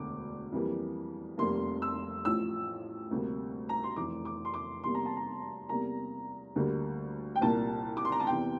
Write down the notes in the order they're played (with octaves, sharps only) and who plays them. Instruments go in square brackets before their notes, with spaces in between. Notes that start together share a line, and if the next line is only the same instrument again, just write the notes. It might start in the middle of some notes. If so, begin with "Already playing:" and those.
Already playing: [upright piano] E1 D2 D3 D6
F2 E3 G3 A#3
F1 F2 C3 G3 A#3 C6
E6
A1 A2 F3 E6
D2 C3 G3 A#3
A#5
C6
F1 F2 E3 D6
D6
C6
D6
E2 C3 G3 A#3 C6
A#5
A5
A#5
E2 C3 G3 A#3 A#5
D2 D3 G3 A#3
G5
C2 A#2 G3 A#3 A5
D6
C6
A#5
A5
E2 C3 E3 G5